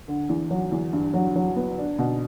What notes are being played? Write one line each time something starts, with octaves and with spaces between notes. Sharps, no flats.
D3
E2
F#3
E2
G2
F#3
F#3
B3
D4
B2